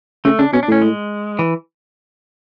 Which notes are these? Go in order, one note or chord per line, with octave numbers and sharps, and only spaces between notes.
C#3 A3
C#3 D4
B2 C#4
D4
A2 C#4
G#3
E3